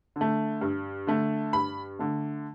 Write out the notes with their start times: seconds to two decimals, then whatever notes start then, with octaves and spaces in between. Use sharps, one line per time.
0.16 D3
0.21 A3
0.61 G2
1.07 D3 A3
1.53 G2 B5
1.99 D3 A3